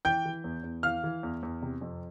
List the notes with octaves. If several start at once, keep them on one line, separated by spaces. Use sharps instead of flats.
E3 G5 G6
E3
E2
E2
E3 F5 F6
E3
E2
E2
C3
F2